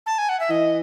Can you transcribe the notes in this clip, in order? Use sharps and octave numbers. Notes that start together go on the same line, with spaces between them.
A5
G#5
F#5
E5
E3 D#5